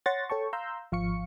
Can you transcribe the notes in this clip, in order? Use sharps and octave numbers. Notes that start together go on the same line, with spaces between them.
C#5 F#5 C6 C#6 A6 A#6
A4 C#5 G5 A5 C#6
F5 A#5 C6 E6 G6
G#1 F3 F5 C#6 C#7